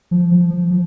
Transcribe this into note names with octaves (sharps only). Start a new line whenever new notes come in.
F3
F3
F3
F3